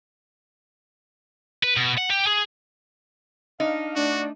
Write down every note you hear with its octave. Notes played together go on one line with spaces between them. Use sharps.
B4
B2
F#5
G4
G#4
D4 D#4 F5
A3 D4 F#4